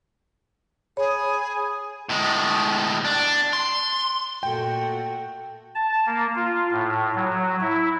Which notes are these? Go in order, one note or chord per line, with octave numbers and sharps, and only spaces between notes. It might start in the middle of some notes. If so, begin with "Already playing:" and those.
G#4 C#5 B5 D#6
A2 G#3
D4
C6
A#2 A3 F#4 G5
A5
A#3
F4
A2
F#3
E4